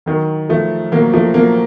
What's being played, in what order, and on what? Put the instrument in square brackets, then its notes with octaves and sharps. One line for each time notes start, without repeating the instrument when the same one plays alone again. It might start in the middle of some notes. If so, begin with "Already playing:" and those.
[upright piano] D#3 F#3
F3 A3
F#3 A#3
F3 A3
F#3 A#3